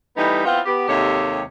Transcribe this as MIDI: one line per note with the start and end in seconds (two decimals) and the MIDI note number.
0.17 0.43 52
0.17 0.43 55
0.17 0.43 57
0.17 0.43 59
0.17 0.43 63
0.45 0.60 59
0.45 0.60 60
0.45 0.60 64
0.45 0.60 65
0.66 0.85 59
0.66 0.85 67
0.88 1.42 39
0.88 1.42 48
0.88 1.42 56
0.88 1.42 67
0.88 1.42 69
0.88 1.42 73